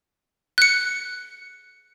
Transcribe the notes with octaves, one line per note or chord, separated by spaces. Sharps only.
F#6 C#7